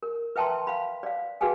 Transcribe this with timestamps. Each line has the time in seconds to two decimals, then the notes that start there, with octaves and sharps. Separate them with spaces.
0.03 A#4
0.36 B4 E5 G5 A5 A#5 C6
0.67 F5 B5
1.03 D5 F5
1.41 F#4 G#4 B4 F5 G5 G#5